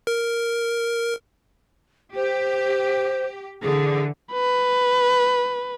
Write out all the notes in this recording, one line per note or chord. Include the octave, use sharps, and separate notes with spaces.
A#4
G4 C5
D3 E3 G#4
B4